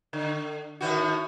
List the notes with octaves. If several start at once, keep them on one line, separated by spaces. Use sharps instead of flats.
D3
A2 D#3 F#4